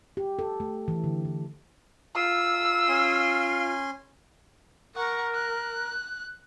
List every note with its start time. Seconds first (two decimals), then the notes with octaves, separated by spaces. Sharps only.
0.17 G4
0.39 A4
0.60 A3
0.88 E3
1.04 D3
1.25 E3
2.16 F4 E6
2.89 C#4 G#5 C6
4.96 A#4 F#5 C#6
5.34 F#6